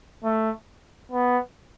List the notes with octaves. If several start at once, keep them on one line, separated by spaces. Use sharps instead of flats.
A3
B3